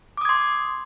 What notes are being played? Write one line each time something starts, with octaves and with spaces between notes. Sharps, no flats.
C6 D6 D#6 G#6